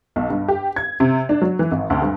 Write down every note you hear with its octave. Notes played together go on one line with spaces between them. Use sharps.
B1
G2
G4
G#6
C3
D4
F#3
E3
G#1
D2
G2